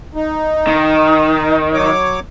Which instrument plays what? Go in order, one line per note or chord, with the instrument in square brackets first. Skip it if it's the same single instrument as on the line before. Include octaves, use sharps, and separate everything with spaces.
[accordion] D#4
[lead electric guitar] D#3
[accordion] F#3 C#5 D6